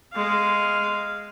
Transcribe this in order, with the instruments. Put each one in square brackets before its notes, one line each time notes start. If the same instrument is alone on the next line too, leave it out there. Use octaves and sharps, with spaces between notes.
[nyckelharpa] G#3 F5